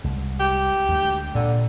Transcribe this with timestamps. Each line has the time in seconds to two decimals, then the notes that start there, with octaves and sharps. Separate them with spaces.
0.04 C2 G#3
0.40 G4
0.89 D2 G#3
1.35 A#2 D3